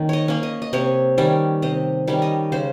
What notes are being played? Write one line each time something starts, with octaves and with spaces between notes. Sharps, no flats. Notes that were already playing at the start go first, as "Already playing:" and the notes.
Already playing: D#3 A#3 C#4
C#5 D#5
A#3 C#4
D#5
D#5
C3 C#5
D#3 G3 C#4
C3 D#5
D#3 G3 C#4
D#5
C#3 C5